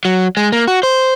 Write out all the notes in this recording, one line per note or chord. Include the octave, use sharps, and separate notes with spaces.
F#3
G#3
A#3
F#4
C5